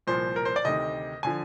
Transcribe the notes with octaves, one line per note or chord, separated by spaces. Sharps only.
C2 A#2 F3 C5
A#4
C5
D5
D2 C3 D#3 D#5
D3 F3 G#5